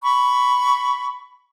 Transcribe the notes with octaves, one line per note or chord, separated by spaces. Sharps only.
B5 C#6